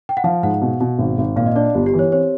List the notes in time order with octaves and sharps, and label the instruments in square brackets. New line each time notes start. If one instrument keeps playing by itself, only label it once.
[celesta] G5
F#5
[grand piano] F3 [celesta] F5
[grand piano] G#2 [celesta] F#5
[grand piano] B2
B2
G#1
G#1
[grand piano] A#2 [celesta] F5
[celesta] D#5
[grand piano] D4 [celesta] D5
[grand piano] G1 [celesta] G4
[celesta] G4
[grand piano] E3
[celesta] C#5
[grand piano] C4 [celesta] C#5